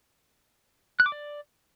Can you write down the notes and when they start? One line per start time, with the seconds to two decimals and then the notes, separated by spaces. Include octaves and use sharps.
1.00 F#6
1.06 D6
1.12 D5